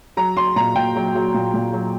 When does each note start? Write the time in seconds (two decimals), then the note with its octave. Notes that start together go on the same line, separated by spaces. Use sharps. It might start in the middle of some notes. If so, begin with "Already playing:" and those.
0.17 F#3 A#5
0.37 F#3 C6
0.56 A#2 A#5
0.75 A#2 G5
0.96 F#3
1.15 F#3
1.34 A#2
1.54 A#2
1.73 F#3